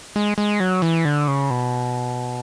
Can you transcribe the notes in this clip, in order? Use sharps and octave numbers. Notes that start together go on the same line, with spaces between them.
G#3
G#3
F#3
E3
D3
C#3
B2